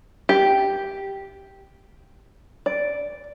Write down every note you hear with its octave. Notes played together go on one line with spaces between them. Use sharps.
G4
D5